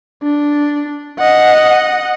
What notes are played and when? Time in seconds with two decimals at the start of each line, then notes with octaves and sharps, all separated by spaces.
0.23 D4
1.19 D#5 F#5